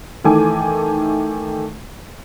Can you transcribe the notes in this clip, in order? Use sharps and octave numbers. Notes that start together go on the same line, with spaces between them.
D#3 E3 A3 A4 G#5 D6